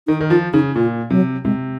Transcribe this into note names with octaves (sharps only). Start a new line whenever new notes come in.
D#3 D#4
D#3
F3 F4
C#3 D#4
A#2 F4
C3 F#3
C3 G#3